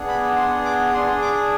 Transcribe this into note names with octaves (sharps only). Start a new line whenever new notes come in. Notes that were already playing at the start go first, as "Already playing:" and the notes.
Already playing: B3 D4 G#4
B5
C6
D6
D4 G#4 C6
D6